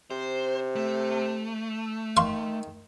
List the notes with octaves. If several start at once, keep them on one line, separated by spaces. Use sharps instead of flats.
C3 C5
A3
D#3 F5 C6 C#6